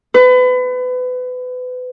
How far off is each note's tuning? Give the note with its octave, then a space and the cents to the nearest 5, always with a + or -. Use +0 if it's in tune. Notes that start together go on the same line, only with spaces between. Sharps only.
B4 +30